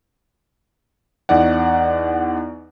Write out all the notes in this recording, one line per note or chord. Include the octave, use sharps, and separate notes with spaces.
E2 D#4 D5 F#5